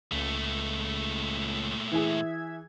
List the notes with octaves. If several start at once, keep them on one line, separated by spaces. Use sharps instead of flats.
C#2 A#2 A3
E3 G#4 E5 G#6